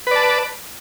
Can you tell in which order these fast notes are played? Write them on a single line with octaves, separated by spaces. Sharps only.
B4 D5 A5